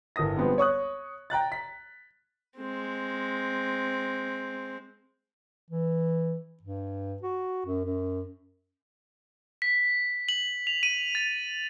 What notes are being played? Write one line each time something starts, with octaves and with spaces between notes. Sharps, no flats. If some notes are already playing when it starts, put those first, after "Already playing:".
G1 A2 A#4 D#6 A#6
D3 F3 G3 G#3 B3 C4
C#5 C#6 D#6 F#6
G5 A#5 F#6 A6
B6
G#3 C4
E3
G2
F#4
F#2
F#2
B6
F#7
F7
D#7
A6